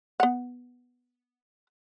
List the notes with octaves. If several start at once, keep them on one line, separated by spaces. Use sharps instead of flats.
B3 F#5